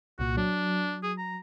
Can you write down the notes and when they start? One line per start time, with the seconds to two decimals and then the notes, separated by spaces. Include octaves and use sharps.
0.19 C2 A#2 F#4
0.37 F#3 D4
1.03 G#4
1.18 A#5